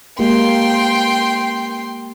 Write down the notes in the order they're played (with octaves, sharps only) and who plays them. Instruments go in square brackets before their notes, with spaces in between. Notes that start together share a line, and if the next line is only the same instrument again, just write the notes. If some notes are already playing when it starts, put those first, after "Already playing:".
[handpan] G#3 A#3 G4 [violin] G5 C6